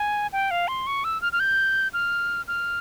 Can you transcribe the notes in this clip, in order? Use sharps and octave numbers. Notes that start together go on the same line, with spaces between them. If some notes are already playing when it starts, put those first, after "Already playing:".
Already playing: G#5
G5
F5
C6
C#6
E6
F6
F6
G6
F6
F6